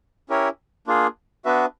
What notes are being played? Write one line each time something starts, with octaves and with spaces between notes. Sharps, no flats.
C#4 E4 G4 A#4 C#5
A#3 D4 F4 G#4
B3 D4 F#4 B4 E5